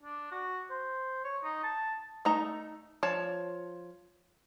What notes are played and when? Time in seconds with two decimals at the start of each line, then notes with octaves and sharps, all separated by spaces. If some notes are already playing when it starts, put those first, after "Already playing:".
0.03 D4
0.32 F#4
0.70 C5
1.24 C#5
1.43 D#4
1.63 A5
2.25 A3 D#4 A#5
3.03 F3 C#5 A5